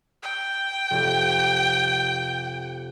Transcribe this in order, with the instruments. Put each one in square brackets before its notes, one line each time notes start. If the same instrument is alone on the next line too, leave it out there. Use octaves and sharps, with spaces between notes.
[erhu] G5
[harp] F1 G4